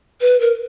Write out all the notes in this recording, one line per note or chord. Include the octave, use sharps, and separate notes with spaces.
B4
A#4